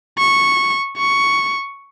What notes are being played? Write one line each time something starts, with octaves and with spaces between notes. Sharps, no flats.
C#6
C#6